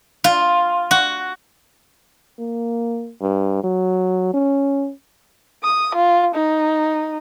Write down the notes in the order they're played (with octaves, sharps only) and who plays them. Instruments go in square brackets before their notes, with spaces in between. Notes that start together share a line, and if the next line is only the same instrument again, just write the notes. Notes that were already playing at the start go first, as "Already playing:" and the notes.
[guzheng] F4
F#4
[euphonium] A#3
G2
F#3
C#4
[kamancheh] D#6
F4
D#4